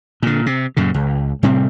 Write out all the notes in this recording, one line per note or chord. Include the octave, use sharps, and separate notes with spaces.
A#2 D3
C3
F#2 A#2 C#3
C#2
A2 C3 G3 C4